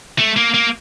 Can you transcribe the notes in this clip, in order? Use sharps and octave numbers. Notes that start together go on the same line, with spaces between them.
A3
A#3
A#3